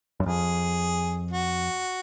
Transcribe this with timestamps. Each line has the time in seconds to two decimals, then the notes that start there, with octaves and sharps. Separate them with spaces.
0.20 F#2
0.26 F2 G#4
1.31 F#4